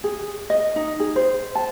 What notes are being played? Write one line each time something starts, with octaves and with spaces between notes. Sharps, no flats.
G#4
D#5
D#4
G#4
C5
A5